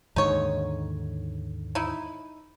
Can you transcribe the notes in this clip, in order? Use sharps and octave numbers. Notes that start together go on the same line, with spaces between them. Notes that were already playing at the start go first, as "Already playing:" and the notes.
D#2 G#2 D3 D#4 C#5
D#4 E4